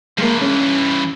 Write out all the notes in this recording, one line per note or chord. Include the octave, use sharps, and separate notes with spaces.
G2 E3 G#3 A#3
C#4